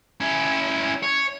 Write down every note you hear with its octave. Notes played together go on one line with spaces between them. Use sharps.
C#4 E4
C#5